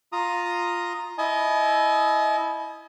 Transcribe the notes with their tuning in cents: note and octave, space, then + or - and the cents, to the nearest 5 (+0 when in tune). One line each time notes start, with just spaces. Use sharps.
F4 +5 A#5 +0 D#6 +0
E4 -10 D#5 +0 G#5 +45